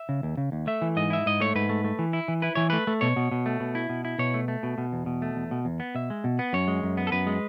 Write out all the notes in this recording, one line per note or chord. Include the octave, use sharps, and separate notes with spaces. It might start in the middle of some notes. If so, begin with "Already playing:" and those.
Already playing: E5
C#3
D#2
C#3
D#2
A3 E5
E3
G#2 D#5
E4 E5
G#2 D#5
A3 C#5
G#2 B4
A3
A3
E3
E4
E3
E4 B4
E3 C#5
A3 B4
A3
B2 C#5
B2
B2
A3
B2
E4
B2
E4
B2 C#5
A3
A3
B2
B2
E2
B2
A3
E2
B2
E2
B3
B2 E5
G#3
B2
B3
F#2 C#5
G#3
F#2
B3
A4
F#2 B4
G#3